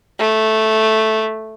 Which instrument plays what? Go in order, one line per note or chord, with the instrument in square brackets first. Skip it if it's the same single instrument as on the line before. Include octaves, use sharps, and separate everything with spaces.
[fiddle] A3